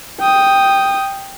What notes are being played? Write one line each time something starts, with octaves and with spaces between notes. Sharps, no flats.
G5 D#6